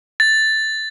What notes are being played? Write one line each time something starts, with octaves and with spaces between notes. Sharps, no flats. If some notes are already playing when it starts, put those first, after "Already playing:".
A6